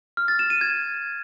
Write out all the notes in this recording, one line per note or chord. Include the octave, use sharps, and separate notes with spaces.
F6
A6
E7
D#7
G#6